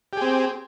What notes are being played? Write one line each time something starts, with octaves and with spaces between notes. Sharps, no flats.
C4 G4 G#4